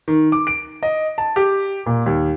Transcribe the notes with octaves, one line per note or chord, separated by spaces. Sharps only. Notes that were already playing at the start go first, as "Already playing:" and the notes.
D#3
D6
D7
D#5
A5
G4
A#2
D#2